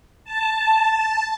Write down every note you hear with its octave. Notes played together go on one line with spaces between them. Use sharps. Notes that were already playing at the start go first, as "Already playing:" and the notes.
A5